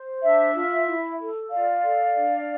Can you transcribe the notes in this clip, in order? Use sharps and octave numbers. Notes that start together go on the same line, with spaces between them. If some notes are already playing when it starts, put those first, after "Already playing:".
Already playing: C5
D4 E5
F4
E4
A4
F4 D5 F5
A4
D4